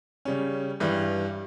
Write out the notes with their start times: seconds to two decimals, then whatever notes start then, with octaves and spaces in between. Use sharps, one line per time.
0.25 C#3 G3 C#4
0.80 G2 E3 G3